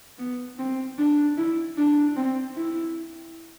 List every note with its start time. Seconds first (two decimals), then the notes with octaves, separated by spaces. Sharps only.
0.19 B3
0.59 C4
0.99 D4
1.38 E4
1.78 D4
2.17 C4
2.56 E4